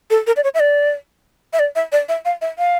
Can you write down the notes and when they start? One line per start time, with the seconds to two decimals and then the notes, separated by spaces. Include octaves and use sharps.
0.10 A4
0.27 A#4
0.36 D5
0.44 C#5
0.54 E5
0.60 D5
1.53 E5
1.59 D5
1.76 E5
1.92 D5
2.09 E5
2.25 F5
2.42 E5
2.58 F5